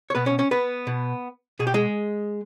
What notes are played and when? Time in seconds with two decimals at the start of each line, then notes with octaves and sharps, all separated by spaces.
0.10 C#5
0.15 B2 B3 B4
0.26 C#4 C#5
0.39 C#4 C#5
0.51 B3 B4
0.87 B2
1.59 B2 G#4
1.67 G4
1.74 G#3 G#4